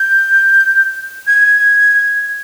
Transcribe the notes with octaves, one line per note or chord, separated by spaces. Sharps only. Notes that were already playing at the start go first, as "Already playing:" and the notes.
Already playing: G6
G#6